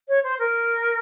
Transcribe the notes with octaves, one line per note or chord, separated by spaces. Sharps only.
C#5
C5
A#4